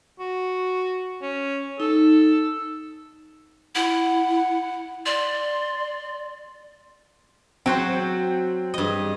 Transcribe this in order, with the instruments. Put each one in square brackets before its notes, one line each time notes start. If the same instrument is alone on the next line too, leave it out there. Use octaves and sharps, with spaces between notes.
[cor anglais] F#4
C#4
[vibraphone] D#4 [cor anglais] A4
[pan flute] E4 [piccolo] F#5
[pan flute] D5 [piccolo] C6
[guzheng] F#3 F#4 C5 [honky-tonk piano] C4
[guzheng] G2 D#5